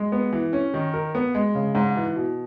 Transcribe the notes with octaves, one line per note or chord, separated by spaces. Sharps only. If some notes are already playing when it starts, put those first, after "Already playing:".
Already playing: G#3
B3
E3
C#4
D#3
A#4
B3
G#3
C#3
G#2
E3
B2